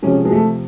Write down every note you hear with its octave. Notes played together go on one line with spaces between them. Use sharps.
C3 F3 G#3 C#4
G#3
A3